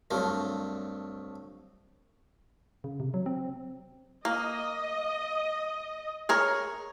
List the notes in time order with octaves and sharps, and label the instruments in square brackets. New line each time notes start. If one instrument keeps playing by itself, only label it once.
[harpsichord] C2 G2 F3 F#3 A3
[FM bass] C#3
C3
F#3
C4
[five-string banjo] A#3 [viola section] D#5
[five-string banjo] G#4 A#4 C#5